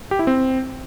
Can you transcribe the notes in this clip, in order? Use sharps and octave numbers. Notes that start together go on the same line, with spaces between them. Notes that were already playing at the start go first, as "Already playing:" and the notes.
G4
E4
C4